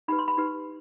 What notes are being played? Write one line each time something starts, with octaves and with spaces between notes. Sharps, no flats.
D#4 G4 B4 B5
C6
B5
D#4 G4 B4